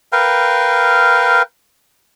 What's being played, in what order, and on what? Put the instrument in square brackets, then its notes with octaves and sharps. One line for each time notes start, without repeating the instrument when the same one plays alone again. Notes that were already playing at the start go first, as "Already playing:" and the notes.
[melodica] A#4 B4 F5 G5